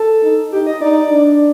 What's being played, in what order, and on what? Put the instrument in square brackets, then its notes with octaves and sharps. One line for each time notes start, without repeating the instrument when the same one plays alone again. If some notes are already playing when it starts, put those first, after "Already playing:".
Already playing: [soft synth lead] A4
[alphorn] D#4
[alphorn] D#4 [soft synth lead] G4
[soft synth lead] D#5
[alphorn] D#4 [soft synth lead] D5
[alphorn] D4